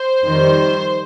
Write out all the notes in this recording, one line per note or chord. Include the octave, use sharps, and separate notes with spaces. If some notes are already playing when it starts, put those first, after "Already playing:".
Already playing: C5
F2 D#3 G3